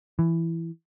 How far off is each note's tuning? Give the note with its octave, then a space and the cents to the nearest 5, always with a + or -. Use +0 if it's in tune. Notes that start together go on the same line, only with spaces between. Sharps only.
E3 +10